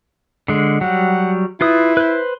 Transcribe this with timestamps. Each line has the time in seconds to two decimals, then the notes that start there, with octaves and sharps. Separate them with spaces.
0.48 D3 G#3
0.81 F#3 G3 F#5
1.61 E4 F4 B4 D#6
1.97 B4 C5